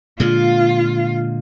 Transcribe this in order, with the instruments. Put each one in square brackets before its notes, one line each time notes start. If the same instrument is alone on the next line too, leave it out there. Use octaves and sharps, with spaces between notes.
[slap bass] A#2 D3 G#3 [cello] F4 F5